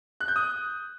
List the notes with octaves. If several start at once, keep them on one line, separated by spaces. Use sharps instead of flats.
F#6
G6
D#6